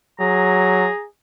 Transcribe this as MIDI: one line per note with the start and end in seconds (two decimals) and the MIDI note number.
0.20 0.89 54
0.20 1.06 68
0.20 1.02 82